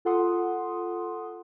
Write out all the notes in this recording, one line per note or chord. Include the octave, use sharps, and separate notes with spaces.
F4 A4 F#5 C6 D#6